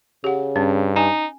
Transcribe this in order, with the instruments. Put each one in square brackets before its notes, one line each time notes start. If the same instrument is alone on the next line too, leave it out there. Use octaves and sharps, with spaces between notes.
[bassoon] C#3 [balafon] G4 F#5
[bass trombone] G2 [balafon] C#4
[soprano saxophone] D#4 [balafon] G#5